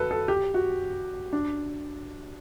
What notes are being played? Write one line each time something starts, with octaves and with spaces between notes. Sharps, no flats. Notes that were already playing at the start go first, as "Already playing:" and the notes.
Already playing: F#4 A4 B4
A4
G4
F#4
D4